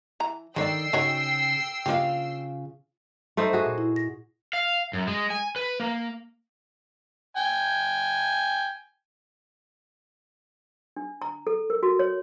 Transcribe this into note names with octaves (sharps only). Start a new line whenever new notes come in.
E3 A#5
D3 D#3 C#5 D5 G5 E6 C7
C#3 D#4 F#4 C#5
C#3 A#3 D4 F4 G4 F5
A3 D#4 C5
F#4 G#4
A#2
E4
A#6
F5
F#2
G#3
G#5
B4
A#3
G5 G#5
D4
A#5
A4
A#4
F#4
C#5